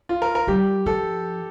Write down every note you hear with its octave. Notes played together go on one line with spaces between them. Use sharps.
F4
A#4
A#4
G3 G4
F3 A4